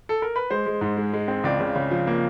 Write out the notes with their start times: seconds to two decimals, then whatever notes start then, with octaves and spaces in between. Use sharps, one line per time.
0.09 A4
0.22 A#4
0.36 B4
0.51 G#3 C5
0.66 G#3
0.81 G#2
0.97 G#3
1.13 G#3
1.28 C4
1.44 C#2 D5
1.60 C#3
1.75 C#3
1.91 F3
2.07 A#3